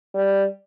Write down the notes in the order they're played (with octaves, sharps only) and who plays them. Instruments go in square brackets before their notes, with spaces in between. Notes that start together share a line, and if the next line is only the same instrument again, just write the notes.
[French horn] G3